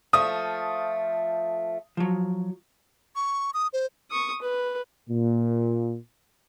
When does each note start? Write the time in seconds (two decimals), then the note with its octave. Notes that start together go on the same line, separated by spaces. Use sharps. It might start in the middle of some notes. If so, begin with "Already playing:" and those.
0.13 F3 A3 D#6
1.97 F3 F#3
3.16 C#6
3.54 D#6
3.73 C5
4.11 C#6 D#6
4.42 B4
5.09 A#2